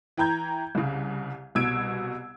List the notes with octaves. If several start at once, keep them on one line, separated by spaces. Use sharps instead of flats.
E3 G5 A#5 G6 G#6
C2 C#3
C2 B2 E6 G#6 D7